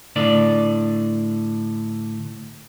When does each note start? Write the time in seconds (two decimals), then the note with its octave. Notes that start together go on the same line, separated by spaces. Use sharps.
0.16 A2 D3 D5